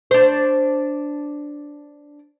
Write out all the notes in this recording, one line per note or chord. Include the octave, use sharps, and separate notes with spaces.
D4 C5